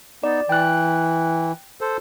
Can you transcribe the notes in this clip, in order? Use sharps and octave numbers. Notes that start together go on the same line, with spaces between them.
B3 D#4 D5
E3 G5 F#6
A4 C5